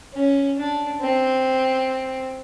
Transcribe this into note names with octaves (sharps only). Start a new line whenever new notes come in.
C#4
D4
C4